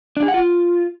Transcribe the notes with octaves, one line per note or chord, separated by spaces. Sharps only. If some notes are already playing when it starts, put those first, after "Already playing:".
D4
G#4
F#5
F4